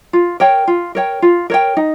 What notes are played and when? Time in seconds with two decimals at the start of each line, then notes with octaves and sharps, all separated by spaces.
0.13 F4
0.40 A#4 C#5 G5
0.68 F4
0.95 A#4 C#5 G5
1.22 F4
1.50 A#4 C#5 G5
1.77 D#4